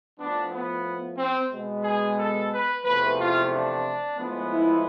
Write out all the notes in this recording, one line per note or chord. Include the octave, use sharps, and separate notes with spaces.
A2 F3 B3 D4
B3
C4
B2 G#3 B3
G#4
A4
B4
E2 C3 F3 A3 B4
F4
D4
A2 F3 G#3 B3
E4